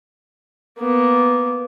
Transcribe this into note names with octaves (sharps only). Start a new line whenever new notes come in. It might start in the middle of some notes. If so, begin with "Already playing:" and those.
A#3 B3